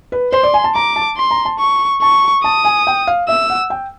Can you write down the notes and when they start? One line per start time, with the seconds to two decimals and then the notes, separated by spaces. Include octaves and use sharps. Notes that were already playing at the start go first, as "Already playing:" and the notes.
0.12 B4
0.32 C5 C6
0.43 D5
0.54 G#5
0.64 A5
0.75 A#5 D6
0.96 A5
1.17 C6
1.31 A#5
1.45 A5
1.59 C#6
2.02 A5 C#6
2.44 A5 D#6
2.65 G#5
2.87 G5
3.07 F5
3.28 E5 E6
3.50 F#5
3.70 G5